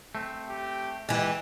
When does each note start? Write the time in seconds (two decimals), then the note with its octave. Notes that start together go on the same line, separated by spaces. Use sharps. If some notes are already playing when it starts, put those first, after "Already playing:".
0.15 A3 C4
0.49 G4
1.09 E3 G#3 G4